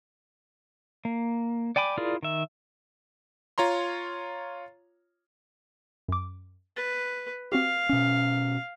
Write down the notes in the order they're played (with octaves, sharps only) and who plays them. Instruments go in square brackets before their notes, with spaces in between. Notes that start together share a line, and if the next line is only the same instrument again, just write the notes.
[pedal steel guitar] A#3
D5 G5 G#5 B5 D6
E4 F4 G#4 A#4 D5
D#3 E5
[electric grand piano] F4 C#5 A#5 C6
[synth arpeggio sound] F#2 D6
[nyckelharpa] B4 [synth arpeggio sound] A6
[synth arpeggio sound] C4 F#4 G4 [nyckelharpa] F5
[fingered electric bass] B2 C#4